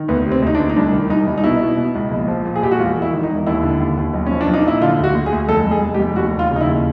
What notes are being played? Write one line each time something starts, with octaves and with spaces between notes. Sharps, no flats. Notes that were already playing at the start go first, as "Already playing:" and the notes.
Already playing: D#3
D2 B3
C3
C4
D2 D#4
D4
D2
D#4
C2 D4
D#3
C2 D#4
C2
D#4
B2 E4
B2
B2
C#2
A#1
F3
A#2
G#4
A#1 G4
F#4
E1 F4
E1
E4
D#3
D#4
E1
D#2 E4
D3
D#2
D#2
B1
F3 C#4
D4
B1
D#4
A#2 E4
D3 F4
D2 F#4
D2
G#4
D2
F1 A4
F1
G#4
F1
G4
F1
D#2 F#4
D#2
F4
C#3
D#4
E4
D#2